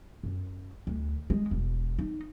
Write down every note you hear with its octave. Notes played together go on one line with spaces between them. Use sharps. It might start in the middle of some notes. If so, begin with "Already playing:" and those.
F#2
D2
G#3
E1
D#4